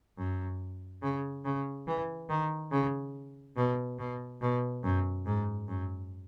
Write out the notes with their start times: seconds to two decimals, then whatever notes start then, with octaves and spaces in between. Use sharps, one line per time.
0.18 F#2
1.02 C#3
1.45 C#3
1.87 E3
2.29 D#3
2.71 C#3
3.57 B2
3.99 B2
4.41 B2
4.84 F#2
5.26 G#2
5.68 F#2